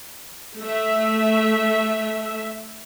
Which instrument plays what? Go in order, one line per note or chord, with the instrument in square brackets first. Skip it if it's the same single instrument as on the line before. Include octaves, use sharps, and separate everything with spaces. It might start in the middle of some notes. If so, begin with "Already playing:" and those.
[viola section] A3 E5